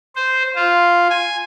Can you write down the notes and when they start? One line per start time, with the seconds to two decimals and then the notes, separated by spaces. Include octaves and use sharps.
0.16 C5
0.55 F4
1.10 G#5